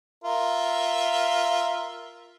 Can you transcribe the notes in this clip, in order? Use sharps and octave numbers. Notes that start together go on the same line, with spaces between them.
F4 A#4 E5